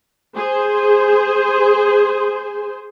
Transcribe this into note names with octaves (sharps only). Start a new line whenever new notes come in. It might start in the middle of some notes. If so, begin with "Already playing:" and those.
G#4 C5